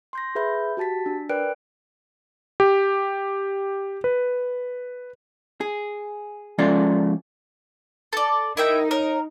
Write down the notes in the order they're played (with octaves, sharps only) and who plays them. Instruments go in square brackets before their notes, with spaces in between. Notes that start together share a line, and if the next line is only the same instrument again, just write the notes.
[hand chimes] C6 G6 A#6
G#4 B4 E5 B5 G6
F#4 G4 A5 A6 B6
D4
A#4 B4 D5 G5 F#6 D7
[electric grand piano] G4
B4
[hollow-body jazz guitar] G#4
F3 G#3 C#4 F4 A4 D5
[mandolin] A4 D5
[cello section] D#4 [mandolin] E4 E5 G5 [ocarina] A#4
[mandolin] A#4 [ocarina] C#5